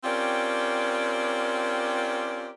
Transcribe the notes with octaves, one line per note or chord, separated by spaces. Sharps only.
C4 C#4 F4 G4 A#4 D5